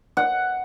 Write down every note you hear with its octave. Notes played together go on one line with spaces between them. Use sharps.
F#5